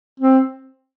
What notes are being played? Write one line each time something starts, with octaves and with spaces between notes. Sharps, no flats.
C4